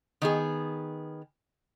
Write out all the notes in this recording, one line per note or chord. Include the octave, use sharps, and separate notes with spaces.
D#3 B3 G#4